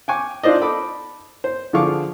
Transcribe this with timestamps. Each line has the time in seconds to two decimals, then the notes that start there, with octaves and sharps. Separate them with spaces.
0.08 G5 G#5 C#6 D6
0.43 D4 D#4 F4 C5 D5 D#5
0.61 A4 B5 D6
1.44 C5
1.73 D3 F3 G#4 F5 C#6 D6